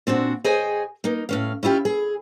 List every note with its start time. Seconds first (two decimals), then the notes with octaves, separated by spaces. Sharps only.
0.07 A#2 C4 D4 F#4
0.44 G#4 C5 C#5 D#5 G5 G#5
1.04 A#3 D#4
1.29 A2 C#4 F5
1.63 C#4 E4 F4 G4
1.85 G#4